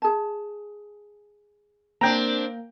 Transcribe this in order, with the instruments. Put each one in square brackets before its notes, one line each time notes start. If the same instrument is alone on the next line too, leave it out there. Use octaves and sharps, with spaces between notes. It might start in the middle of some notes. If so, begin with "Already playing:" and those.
[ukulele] G#4 A5
[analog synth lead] A#3 [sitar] C4 D4 [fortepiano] G5 A#5